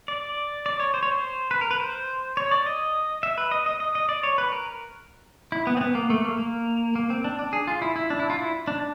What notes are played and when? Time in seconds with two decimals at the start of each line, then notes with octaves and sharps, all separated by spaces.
0.08 D5
0.66 D5
0.80 C#5
0.94 C5
1.03 C#5
1.12 C5
1.51 B4
1.61 A#4
1.71 B4
1.80 C5
2.37 C#5
2.51 D5
2.66 D#5
3.23 E5
3.38 B4
3.51 D#5
3.66 D#5
3.80 D#5
3.95 D#5
4.09 D5
4.23 C#5
4.38 B4
4.52 A#4
5.52 E4
5.67 B3
5.77 C4
5.81 B3
5.95 A#3
6.10 A3
6.25 A#3
6.38 A#3
6.95 A#3
7.10 C4
7.24 D4
7.39 D4
7.53 G#4
7.68 F4
7.82 E4
7.96 E4
8.10 D4
8.20 E4
8.30 F4
8.39 E4
8.68 D4